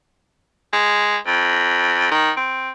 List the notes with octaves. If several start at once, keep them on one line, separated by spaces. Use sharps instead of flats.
G#3
F2
D#3
C4